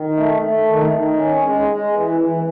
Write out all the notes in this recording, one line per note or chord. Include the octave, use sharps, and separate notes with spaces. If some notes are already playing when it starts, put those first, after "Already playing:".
Already playing: D#3
A3
A3
D#3
D#3
C#4
G#3
G#3
E3
E3